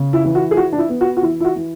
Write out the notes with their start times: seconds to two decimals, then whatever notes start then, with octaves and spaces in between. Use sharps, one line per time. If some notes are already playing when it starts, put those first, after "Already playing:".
Already playing: C#3
0.13 E4
0.24 E3
0.35 F#4
0.51 G#4
0.56 E3 F#4
0.72 D4
0.78 E4
0.89 B3
1.01 F#4
1.17 F#4
1.23 E3 E4
1.40 E4
1.45 F#4
1.56 E3